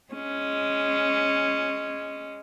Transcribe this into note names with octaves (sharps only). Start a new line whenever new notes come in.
G#3 C#4